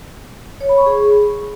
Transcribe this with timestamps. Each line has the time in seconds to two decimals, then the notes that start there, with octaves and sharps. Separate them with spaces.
0.61 C#5
0.69 B5
0.78 C#6
0.86 G#4